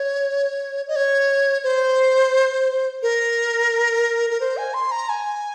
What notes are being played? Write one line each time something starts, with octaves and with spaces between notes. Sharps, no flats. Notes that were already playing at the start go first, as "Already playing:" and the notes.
Already playing: C#5
D#5
C#5
C5
A#4
A#4
C5
G#5
C6
A#5
G#5